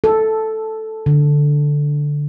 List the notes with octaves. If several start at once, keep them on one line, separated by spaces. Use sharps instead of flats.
A4
D3